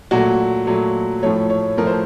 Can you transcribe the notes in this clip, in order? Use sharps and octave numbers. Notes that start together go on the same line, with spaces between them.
A#2 F#3 A3 F#4
A#2 F#3 A3
A2 F3 A3 C#5
C#5
A2 F3 A3 A#4
C5